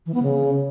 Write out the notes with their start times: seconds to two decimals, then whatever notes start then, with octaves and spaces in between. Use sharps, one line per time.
0.06 E3
0.14 B3
0.23 C#3